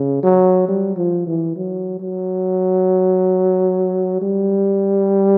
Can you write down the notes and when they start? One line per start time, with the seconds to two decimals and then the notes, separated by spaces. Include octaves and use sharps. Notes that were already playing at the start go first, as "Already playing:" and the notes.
Already playing: C#3
0.23 F#3
0.68 G3
0.97 F3
1.27 E3
1.56 F#3
2.00 F#3
4.22 G3